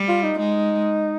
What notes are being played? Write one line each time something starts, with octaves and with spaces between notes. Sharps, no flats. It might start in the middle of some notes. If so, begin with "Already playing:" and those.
Already playing: G3
F4
D#4
G#3 D#4